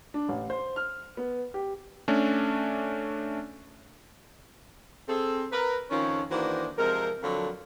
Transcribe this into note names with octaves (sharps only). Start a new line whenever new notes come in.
D4
A1
C5
F6
B3
G4
A3 C#4 D4
C4 G#4 A4
A#4 B4
F2 D#3 F3 C#4
D#3 E3 A#3 D4 F#4 C5
C3 F3 G#3 A#4
F2 D3 F3 F#3